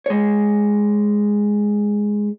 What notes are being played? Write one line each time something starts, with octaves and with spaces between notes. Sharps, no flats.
G#3 C#5